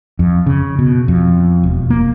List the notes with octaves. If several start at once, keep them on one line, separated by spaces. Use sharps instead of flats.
F2
C#3
B2
F2
E1
A#3